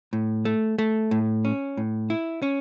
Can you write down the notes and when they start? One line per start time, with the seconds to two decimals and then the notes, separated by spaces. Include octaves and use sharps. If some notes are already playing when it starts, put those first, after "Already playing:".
0.13 A2
0.45 A3
0.78 A3
1.11 A2
1.45 C#4
1.77 A2
2.10 E4
2.42 C#4